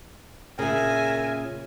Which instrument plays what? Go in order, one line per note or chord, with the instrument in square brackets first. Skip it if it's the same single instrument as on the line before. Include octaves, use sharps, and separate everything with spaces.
[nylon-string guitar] A#2 C#3 [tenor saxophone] A#4 [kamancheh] E5 G#5